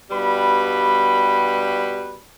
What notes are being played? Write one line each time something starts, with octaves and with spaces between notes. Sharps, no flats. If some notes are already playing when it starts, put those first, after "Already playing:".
G2 B2 G3 B4 B5